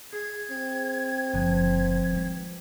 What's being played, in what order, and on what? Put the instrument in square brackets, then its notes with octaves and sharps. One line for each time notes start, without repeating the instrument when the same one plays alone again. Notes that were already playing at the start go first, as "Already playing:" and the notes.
[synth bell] G#4 [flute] G#6
[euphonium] C4
[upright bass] F#1 D3 [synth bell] F3 B4
[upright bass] D#3 G#3